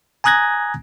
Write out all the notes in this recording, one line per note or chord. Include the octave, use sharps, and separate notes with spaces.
G#5 A#5 D#6 F#6 G#6 A#6